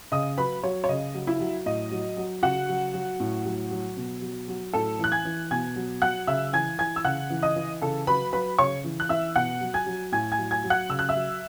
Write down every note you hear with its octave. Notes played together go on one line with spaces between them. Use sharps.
C#3 D#5 D#6
F#3 B4 B5
F#3 C#5
C#5
C#3 D#5
F#3
E4 E5
F#3
A2 D#5
F#3
F#3
C#3 F#4 F#5
F#3
F#3
A2
F#3
F#3
B2
F#3
F#3
A2 A4 A5
E3 F#6
G#5 G#6
E3
B2 G#5 G#6
F#3
F#3 F#5 F#6
C#3 E5 E6
E3 G#5 G#6
E3 G#5 G#6
E6
C#3 F#5 F#6
E3
D#5 D#6
E3
C#3 A4 A5
F#3 B4 B5
F#3 B4 B5
C#3 C#5 C#6
E3
F#6
E3 E5 E6
B2 F#5 F#6
F#3
G#5 G#6
F#3
A2 G#5 G#6
G#5 G#6
F#3
G#5 G#6
F#3
F#5 F#6
C#3 E6
F#6
E5 E6
F#3